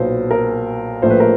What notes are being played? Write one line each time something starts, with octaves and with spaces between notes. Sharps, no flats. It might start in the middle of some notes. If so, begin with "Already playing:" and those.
Already playing: B1 A#2 F#3 B3 C5
A#4
A#1 A2 F3 A3 C5
B4
A#4